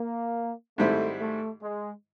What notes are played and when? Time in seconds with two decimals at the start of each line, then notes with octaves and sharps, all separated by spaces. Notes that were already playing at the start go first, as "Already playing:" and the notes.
Already playing: A#3
0.78 G#2 D#3 G3 A3 C4 E4
1.20 A3
1.62 G#3